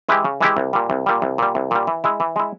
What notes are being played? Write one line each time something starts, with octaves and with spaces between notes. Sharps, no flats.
E3 G#3 E4 G4
C#3
E3 G#3 E4 G4
C2
A#2 G3
C2
A#2 G3
C2
A#2 G3
C2
A#2 G3
E3
G#3 E4
E3
G#3 E4